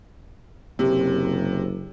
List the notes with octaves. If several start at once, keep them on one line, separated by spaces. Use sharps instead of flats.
F#1 C3